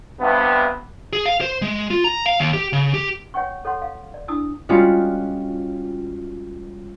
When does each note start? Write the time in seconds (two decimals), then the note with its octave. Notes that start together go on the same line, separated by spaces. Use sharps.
0.20 G2 C3 B3
1.13 G#4
1.25 F5
1.41 C5
1.62 G#3
1.90 F4
2.04 A#5
2.26 F5
2.40 D#2
2.53 G4
2.73 C#3
2.94 G4
3.34 C#5 F#5 G5 C#6
3.65 A4 C#5 F#5 C6
3.82 F5
4.14 D5
4.28 D4 E4 D#6 E6
4.69 G3 G#3 C#4 F4 F#4